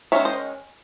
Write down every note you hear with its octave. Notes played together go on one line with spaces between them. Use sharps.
D#3 G#3 C#4 C#5 E5
C5 D#5